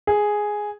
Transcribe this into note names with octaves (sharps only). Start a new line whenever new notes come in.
G#4